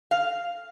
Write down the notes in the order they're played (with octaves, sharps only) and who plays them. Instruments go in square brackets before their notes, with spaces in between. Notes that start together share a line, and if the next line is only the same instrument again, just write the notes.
[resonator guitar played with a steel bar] F5